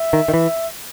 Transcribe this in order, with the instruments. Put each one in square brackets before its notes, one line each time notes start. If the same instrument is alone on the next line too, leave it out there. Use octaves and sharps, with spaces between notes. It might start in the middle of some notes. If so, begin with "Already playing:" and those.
Already playing: [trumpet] E5
[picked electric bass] D#3
D#3
E3